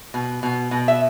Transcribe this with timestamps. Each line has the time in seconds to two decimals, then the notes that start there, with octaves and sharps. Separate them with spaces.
0.14 B2
0.43 B2
0.71 B2
0.88 E5